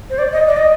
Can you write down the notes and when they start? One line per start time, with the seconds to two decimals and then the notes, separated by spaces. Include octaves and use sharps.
0.10 C5
0.18 D5
0.32 D#5
0.47 D5
0.57 D#5